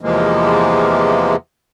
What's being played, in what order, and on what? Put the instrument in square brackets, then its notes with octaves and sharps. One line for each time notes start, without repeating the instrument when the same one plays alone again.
[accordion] E2 C3 E3 F3 G#3 A#3